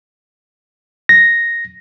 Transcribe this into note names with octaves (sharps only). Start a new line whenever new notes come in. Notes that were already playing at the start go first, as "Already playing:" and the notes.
A#6